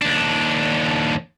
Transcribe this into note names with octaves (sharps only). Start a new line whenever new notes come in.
D#2 D4